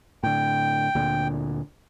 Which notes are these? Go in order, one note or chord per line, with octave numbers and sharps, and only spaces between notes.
A2 D3 G5
D2 A#2 D3